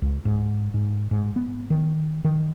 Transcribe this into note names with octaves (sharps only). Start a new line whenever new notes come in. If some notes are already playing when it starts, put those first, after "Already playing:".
C#2
G#2
G#2
G#2
B3
D#3
D#3